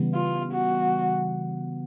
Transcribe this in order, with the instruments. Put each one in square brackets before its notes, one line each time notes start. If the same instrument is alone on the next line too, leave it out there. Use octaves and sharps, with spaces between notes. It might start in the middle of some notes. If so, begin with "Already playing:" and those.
Already playing: [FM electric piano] C#3 E3 G3 B3
[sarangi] F4
F#4